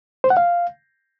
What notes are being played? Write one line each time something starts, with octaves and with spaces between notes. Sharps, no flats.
C5
F#5
F5